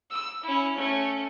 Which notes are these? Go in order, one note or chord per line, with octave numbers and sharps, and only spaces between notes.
E6
C#4 E4
A3 C#4